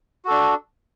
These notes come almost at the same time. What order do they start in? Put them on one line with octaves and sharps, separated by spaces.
F#4 A4 D4